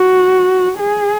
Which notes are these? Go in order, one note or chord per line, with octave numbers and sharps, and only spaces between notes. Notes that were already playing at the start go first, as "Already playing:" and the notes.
Already playing: F#4
G#4